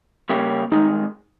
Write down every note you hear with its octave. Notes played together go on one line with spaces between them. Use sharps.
C#3 G3 A#3 C#4 G4
G2 D#3 G#3 D#4